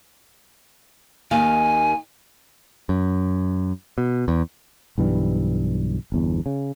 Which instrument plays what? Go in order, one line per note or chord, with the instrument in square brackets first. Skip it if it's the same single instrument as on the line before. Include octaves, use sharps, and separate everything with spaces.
[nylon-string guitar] D#2 D#3 F5 [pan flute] G#5
[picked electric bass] F#2
B2
E2
[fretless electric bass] B1 G2 E3 G3
G1 E2
C#3